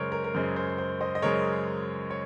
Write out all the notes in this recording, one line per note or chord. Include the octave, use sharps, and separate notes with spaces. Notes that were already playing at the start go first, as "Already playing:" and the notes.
Already playing: F#2 C#3 G#3 A#4 C5 C#5
A#4
A#4
F#2 C#3 G#3 C5
C5
C5
C5 D#5
D#5
F#2 C#3 G#3 A#4 C#5
C#5